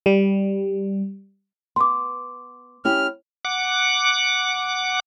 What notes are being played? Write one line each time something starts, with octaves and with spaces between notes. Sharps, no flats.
G3
B3 C6 D6
C#4 E4 G4 F6
F#5 D6